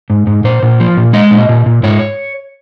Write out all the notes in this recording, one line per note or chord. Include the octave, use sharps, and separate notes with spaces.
G#2
G#2
A#2 C5
A#2
F3
A#2
G#3 D#5
A#2
A#2
A#2
G#2 C#5